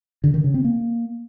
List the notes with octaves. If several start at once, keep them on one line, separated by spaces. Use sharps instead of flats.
D3
D#3
C#3
C4
A#3